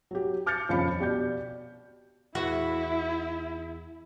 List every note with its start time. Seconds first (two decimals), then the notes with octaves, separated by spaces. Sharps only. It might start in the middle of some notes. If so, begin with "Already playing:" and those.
0.11 F#3 G4
0.46 D6 F6 G6 A6 C#7
0.69 D#1 F2 C#3 F5 B5 C#7
0.99 B2 G4 D5 G6
2.35 E2 E4 F#4